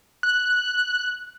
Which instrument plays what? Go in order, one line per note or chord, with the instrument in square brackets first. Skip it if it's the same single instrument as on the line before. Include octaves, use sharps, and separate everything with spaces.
[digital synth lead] F#6